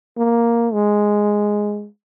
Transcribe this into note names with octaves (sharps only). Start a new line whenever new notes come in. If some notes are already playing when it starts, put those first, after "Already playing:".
A#3
G#3